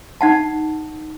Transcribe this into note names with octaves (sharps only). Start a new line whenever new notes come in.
D#4 F#5 A5